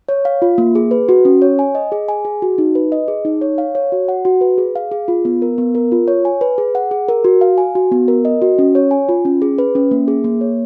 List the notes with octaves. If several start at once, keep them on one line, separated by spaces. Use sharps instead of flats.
C#5
F5
F4
A#3
G#4
B4
F#4
C#4
C#5
G#5
D#5
G#4
G#5
G#4
F#4
D#4
B4
D#5
G#4
D#4
C#5
F5
C#5
F#4
F#5
F#4
B4
G#4
F5
G#4
F4
B3
A#4
B3
A#4
F4
C#5
G#5
B4
G#4
F#5
G#4
A#4
F#4
F5
G#5
F#4
B3
A#4
D#5
F#4
C#4
C#5
G#5
F4
C#4
G#4
B4
C#4
A#3
G#4
A#3
C#5